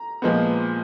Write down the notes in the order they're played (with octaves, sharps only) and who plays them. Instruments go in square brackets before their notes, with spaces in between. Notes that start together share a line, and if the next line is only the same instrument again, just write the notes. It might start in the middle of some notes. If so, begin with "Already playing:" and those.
Already playing: [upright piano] A#5
A#2 F3 G#3 B3